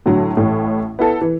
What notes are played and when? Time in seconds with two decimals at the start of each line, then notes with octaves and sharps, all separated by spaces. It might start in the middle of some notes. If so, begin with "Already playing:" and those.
0.06 A2 D3 F#3
0.37 A1 A2
0.99 B3 E4 A4
1.21 E3